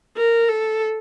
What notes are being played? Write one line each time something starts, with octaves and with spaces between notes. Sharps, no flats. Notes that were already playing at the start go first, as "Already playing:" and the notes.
A#4
A4